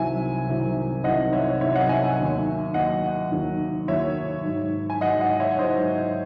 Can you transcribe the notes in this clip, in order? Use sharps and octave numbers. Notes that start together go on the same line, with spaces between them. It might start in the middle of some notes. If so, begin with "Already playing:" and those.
Already playing: C2 C3 D#3 F#3 E5 G#5
C2 C3 D#3 F#3
C2 C3 D#3 F#3 D#5 F#5
C#5 E5
C2 C3 D#3 F#3 C#5 E5
D#5 F#5
E5 G#5
E5 G#5
D#2 D#3 F#3
D#2 D#3 F#3 D#5 F#5
D#2 D#3 F#3
D#2 D#3 F#3 C#5 E5
G#2 F#3
G#5
G#2 F#3 D#5 F#5
D#5 F#5
C#5 E5
G#2 F#3 C5 D#5